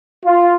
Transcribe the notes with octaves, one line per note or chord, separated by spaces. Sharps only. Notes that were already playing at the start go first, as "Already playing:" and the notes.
F4